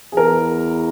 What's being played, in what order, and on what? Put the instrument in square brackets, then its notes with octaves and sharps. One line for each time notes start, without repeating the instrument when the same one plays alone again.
[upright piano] G#4
[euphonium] E2 [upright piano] A#4